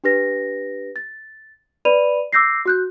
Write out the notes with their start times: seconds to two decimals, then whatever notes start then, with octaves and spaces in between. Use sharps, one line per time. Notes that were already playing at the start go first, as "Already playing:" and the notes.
0.04 D4 G4 B4 A#6
0.96 A6
1.85 B4 D5 B5 D#7 F7
2.33 D6 E6 G6 A#6 C7
2.66 F#4 F#6 G6